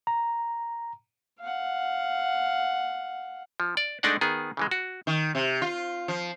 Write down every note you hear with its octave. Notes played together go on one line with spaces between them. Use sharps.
A#5
F5 F#5
F3
D5
G#3 A3 D4 D#4 D5 F#5
D#3 B3 G#4
C#3 E3 G#3
F#4
D#3
C3
F4
F3